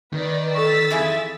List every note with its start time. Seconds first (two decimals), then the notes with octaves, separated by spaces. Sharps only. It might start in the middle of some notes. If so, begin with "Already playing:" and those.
0.13 D#3 B4 D5
0.55 A4 C#6 E6 A6 B6
0.90 F2 E4 G#4